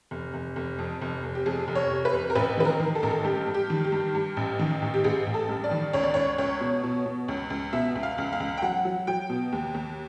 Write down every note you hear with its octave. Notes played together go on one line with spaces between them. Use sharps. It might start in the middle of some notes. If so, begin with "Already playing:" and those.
F1
F1
F1
F2
F1
F1
G4
F2 G#4
F1
C#5
C3
B4
F1
A#4
A1 B4
D#3 B4
A#4
D#3
A4
A1 A#4
A4
G2 G4
G2
G4
D#3
G4
G2
G2
A1
D#3
A1
G4
A1 G#4
A1
A4
G2
D5
D#3
C#2 C#5
D5
C#2 C#5
C#2 C#5
B2
B2
B2
C#2
C#2
B2 E5
C#2
F5
C#2
F5
C#2
G5
F#3 F#5
F#3
F#3 G5
B2
D#2
D#2